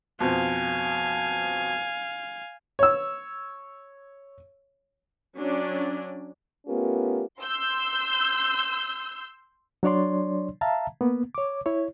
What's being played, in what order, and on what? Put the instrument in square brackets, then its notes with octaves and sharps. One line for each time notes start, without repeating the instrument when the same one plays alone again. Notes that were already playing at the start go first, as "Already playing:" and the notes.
[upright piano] F2 B2 C4 [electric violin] F5 G#5
[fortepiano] C#5 E6
[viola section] F#3 C#4 D4 D5
[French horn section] A3 B3 C#4 F4 G4 A#4
[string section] C6 E6 G6
[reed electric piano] F#3 D4 C#5 D5 C6
E5 F5 A5 A#5
A#3 B3
C#5 D6
E4 C#5